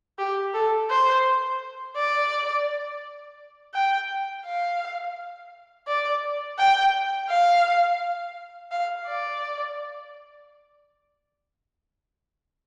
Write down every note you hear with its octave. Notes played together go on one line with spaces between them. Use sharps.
G4
A4
C5
D5
G5
F5
D5
G5
F5
F5
D5